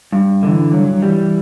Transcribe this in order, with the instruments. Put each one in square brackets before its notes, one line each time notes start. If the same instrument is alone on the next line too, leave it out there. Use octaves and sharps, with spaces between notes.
[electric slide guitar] G2
[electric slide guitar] D3 [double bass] E3
[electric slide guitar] G2 [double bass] F#3
[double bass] E3 [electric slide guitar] G3